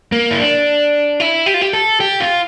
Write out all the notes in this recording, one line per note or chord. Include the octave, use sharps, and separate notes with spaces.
A#3
E4
D4
E4
G4
F4
G4
A4
G4
F4